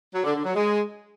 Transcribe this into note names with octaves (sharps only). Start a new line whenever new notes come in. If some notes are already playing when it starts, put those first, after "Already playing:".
F#3
D3
D3
F#3
G#3